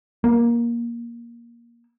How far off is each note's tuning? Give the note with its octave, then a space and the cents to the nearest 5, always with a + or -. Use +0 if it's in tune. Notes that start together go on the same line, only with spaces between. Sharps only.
A#3 +15